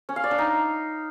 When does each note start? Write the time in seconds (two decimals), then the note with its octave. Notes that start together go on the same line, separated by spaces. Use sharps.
0.09 C#4
0.16 F5
0.24 D5
0.31 D4
0.39 D#4